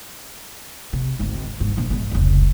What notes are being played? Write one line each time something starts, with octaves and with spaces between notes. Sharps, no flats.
C3
G#1 D2
G#2
A#1 A#2
E2 G#2
F1 C#2